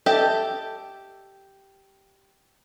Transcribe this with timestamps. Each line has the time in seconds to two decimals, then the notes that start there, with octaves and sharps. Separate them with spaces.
0.06 G4 A4 D#5 E5